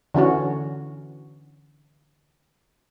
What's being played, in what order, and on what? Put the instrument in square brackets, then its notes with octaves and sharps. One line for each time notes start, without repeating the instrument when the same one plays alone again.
[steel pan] D3 E3 C#4 F#4